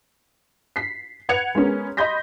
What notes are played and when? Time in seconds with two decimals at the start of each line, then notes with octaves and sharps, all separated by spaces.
0.76 B6 C7
1.29 B4 F#5 G#6 C#7 F7
1.55 G#3 B3 C#4 A#4
1.97 D#5 B5 C6 G6 A#6 B6